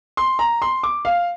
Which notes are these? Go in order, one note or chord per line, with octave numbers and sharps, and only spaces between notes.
C6
A#5
C6
D6
F5